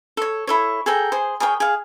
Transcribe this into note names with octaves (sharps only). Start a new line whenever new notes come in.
A4 C#5
E4 A4 C#5
G#4 A4 G5 A#5
G#4 C5
G#4 A#4 C#5 G5
G#4 F5